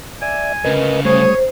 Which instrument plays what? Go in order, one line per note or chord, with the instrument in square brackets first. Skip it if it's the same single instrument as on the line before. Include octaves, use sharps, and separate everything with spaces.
[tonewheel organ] D5 E5 [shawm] G#5
[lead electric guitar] D2 C#3 [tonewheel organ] A#4 B4 D#5
[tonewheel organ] G3 A3 D#6 [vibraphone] C5 [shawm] C#5